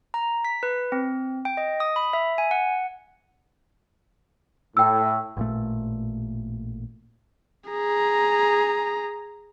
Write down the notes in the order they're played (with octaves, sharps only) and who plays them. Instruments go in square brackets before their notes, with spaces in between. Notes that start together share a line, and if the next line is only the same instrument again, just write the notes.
[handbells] A#5
B6
B4
C4
G5
D#5
D#6
B5
E5
G#5
F#5
[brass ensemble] A2 [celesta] G5 E6
[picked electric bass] A1 A#2 A3
[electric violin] G#4 A#5